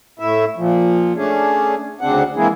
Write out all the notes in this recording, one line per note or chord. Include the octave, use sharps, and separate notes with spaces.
A2 E4 E5
A#2 F3
A3 C#4 D4 G#4
D2 C#3 C4 D4 F#5
E3 G#3 A#3 C4 E4 G#4